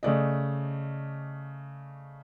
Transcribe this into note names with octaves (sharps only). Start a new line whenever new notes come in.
C#3 A3 D5 D#5